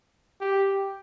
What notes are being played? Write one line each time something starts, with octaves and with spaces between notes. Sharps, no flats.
G4